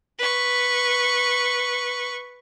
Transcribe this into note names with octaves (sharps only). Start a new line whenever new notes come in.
B4 C#6